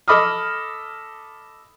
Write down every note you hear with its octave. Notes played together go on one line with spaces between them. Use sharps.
A4 D#5 B5 D6 D#6 F6